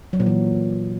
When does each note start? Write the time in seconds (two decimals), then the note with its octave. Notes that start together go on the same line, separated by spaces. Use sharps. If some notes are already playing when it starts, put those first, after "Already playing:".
0.13 F#3
0.20 A#2
0.26 E3